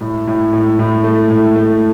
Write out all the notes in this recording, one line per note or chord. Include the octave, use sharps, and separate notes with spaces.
A2
A2
A2
A2
A3
A2
A3